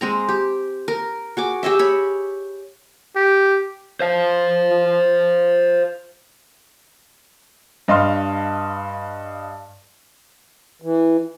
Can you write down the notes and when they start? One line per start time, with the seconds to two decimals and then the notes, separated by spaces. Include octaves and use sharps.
0.01 G#3 C4 A#5
0.29 G4
0.88 A#4
1.37 F#4 G#4 D6
1.63 G4 G#4 D#5 E5
1.79 C#5 B5
3.16 G4
4.00 C5 F5
7.88 G2 D#5 F5 C6 F6
10.82 E3